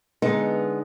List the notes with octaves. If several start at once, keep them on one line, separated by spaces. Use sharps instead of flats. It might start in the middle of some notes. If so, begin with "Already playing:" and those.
D3 G#3 B3 D#4